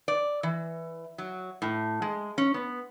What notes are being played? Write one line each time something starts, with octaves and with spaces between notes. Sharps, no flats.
D5
E3
F#3
A2
G#3
C#4
B3